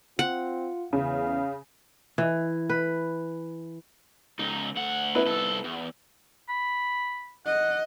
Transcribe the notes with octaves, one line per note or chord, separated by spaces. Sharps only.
C4 F4 F#5
E2 C#3 F5
E3
B4
C#2 D#4
D2 F#5
B3 E4 B4
C2 A4
E2
B5
D#5 F#5